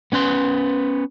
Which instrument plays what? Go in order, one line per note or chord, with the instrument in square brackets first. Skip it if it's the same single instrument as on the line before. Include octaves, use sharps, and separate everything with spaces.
[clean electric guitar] B3 C#4 B4 C6